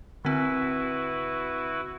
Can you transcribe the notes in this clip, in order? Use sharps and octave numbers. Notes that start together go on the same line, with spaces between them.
D3 C4 E4 F#4 B4